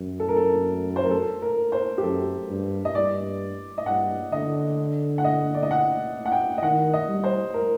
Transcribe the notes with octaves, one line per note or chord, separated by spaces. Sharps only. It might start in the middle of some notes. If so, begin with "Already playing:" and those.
Already playing: F#2
A4
A#4
A4
C5
A#4
A4
A#4
C5
G4
F#2 A4
G2
D#5
G2 D5
D#5
G2 F#5
D3 D#5
F#5
D#5
D5
D#5
F#5
F#5
G5
D#5
D#3 F#5
D#5
G3
C5
A#4